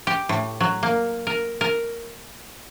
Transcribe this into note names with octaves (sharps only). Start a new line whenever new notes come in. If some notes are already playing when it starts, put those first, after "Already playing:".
G4
A2
F#3
A#3
A#4
A#4